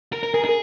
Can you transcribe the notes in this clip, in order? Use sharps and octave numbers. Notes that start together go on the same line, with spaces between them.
A#4
A#4
G#4 A#4
G#4